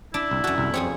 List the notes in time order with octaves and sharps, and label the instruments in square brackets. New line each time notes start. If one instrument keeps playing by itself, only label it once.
[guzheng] D4 [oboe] E4
[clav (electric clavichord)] C2
[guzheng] F#2 A4 [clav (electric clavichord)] F#4
[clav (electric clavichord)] C2
[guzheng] F2 G#4 C#5 [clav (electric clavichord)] C4